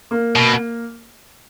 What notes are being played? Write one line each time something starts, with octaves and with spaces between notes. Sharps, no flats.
A#3
B2